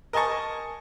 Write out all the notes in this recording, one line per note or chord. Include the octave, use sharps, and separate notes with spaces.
A#4 D#5 G#5 A5 C#6